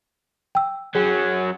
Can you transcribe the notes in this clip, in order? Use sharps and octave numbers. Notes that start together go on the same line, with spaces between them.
G5 E6
F#3 C#4 G#4